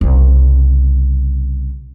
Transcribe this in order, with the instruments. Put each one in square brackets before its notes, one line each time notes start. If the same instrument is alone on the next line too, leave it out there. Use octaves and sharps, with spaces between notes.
[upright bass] C2 C#3